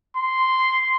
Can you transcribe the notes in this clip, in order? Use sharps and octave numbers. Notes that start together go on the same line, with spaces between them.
C6